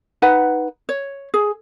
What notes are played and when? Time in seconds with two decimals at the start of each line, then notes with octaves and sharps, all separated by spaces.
0.22 D#4 B4 F#5
0.89 C#5
1.34 G#4